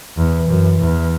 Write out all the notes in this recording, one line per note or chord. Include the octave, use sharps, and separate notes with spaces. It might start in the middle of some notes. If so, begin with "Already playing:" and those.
E2 E3
F#2
E2